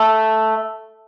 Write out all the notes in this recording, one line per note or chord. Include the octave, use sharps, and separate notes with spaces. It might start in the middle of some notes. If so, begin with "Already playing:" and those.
Already playing: A3